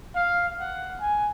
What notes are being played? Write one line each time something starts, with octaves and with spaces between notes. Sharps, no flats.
F5
F#5
G#5